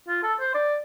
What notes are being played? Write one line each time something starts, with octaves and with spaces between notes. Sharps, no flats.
F4
A4
C5
D5